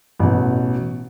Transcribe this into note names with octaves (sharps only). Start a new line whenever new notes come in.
A1 B2